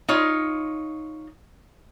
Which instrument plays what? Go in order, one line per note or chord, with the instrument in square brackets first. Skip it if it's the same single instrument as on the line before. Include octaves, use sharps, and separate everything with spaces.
[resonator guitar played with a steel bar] D#4 F4 C#5